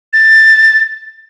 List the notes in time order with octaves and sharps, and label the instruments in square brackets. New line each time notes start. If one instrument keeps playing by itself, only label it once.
[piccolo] A6